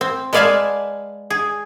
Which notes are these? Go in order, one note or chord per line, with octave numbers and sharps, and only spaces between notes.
C4
G#3 B4 D5 F5 G#5 A5
G#4